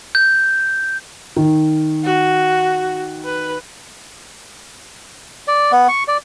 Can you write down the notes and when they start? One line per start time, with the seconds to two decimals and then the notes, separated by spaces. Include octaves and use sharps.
0.15 G6
1.37 D#3
2.03 F#4
3.25 B4
5.48 D5
5.72 B3
5.88 C#6
6.08 D5